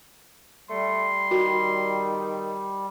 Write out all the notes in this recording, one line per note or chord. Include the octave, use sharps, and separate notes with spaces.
G3 A3 C6
D#3 F#4